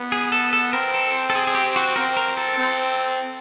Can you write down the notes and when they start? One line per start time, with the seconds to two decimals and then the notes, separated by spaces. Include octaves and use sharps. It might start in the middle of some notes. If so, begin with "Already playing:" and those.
Already playing: B3
0.12 G#4
0.32 A4
0.53 A4
0.73 C4 A#4
0.94 A4
1.30 A4
1.35 G#4
1.47 G#4
1.55 G4
1.76 F#4
1.96 C4 A#4
2.17 A#4
2.37 A4
2.58 C4